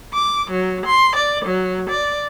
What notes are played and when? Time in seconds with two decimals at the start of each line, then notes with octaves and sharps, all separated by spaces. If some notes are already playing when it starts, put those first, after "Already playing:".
0.14 D6
0.50 F#3
0.86 C6
1.16 D5
1.45 F#3
1.89 D5